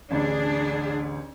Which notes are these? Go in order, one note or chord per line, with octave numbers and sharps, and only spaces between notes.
A1 D2 D4 G#4